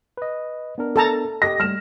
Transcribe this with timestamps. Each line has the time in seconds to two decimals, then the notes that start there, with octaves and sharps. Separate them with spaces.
0.17 B4 D#5
0.78 B3 D4 A#4
0.96 A4 A5 A#5
1.42 G4 D#5 A#6
1.60 G3 A3 F6 E7